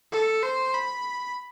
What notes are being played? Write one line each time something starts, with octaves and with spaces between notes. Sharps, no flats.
A4
C5
B5